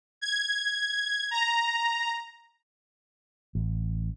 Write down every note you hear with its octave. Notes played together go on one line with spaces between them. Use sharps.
G#6
A#5
A1